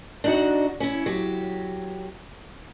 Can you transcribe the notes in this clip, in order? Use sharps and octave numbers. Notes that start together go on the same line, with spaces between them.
D4 D#4 F#4
C#4 E4
F#3 G4